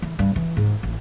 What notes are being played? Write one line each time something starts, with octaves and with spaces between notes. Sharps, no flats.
E3
G2
E3
G#2
A1